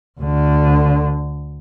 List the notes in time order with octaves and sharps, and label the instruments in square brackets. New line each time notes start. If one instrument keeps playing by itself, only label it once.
[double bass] D2 D3